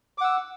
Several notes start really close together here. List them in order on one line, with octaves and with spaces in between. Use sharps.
D6 F#5 E6